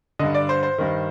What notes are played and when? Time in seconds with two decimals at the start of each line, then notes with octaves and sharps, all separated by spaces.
0.19 G2 D3 D#5
0.34 D5
0.49 C5
0.63 C5
0.78 G2 D#3